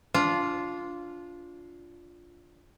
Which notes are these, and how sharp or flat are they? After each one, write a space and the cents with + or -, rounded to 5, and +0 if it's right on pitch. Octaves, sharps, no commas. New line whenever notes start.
D4 -20 F4 +0